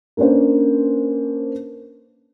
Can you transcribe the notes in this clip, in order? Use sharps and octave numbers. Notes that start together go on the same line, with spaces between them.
A#3 C#4 D4 B4 C5